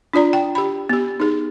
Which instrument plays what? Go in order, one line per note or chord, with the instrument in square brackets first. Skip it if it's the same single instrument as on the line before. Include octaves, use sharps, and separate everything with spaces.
[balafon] D4 F4 D5 A#5
G5
G4 B5
B3 G4
D#4 G#4